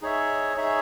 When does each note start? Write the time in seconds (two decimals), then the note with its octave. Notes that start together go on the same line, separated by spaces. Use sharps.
0.02 D#4 G#4 C#5 E5
0.56 D#4 G#4 C#5 E5